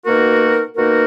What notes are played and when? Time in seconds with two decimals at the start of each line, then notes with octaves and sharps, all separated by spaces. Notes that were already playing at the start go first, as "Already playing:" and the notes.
0.05 B2 A#3 D#4 F#4 A#4
0.76 B2 A#3 D#4 F#4 A#4